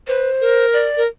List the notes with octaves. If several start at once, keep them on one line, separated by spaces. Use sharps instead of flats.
B4 C5
A#4
D5
A#4